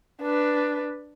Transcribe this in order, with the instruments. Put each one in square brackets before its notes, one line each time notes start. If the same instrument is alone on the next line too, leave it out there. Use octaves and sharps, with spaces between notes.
[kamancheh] D4 B4